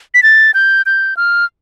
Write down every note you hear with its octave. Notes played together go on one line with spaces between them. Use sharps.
B6
A6
G6
G6
F6